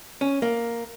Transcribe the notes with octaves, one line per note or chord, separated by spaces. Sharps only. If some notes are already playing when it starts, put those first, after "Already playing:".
C#4
A#3